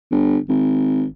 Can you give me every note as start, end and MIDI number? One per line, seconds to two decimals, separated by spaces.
0.11 0.37 31
0.49 1.04 32